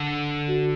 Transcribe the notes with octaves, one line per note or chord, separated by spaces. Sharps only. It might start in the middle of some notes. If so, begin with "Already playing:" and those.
Already playing: D3
F#4